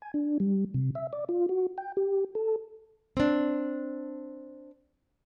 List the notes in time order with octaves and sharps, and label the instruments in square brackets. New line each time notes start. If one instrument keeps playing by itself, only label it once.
[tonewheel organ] G#5
D4
G3
C3
E5
D5
F4
F#4
G5
G4
A4
[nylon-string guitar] C4 D4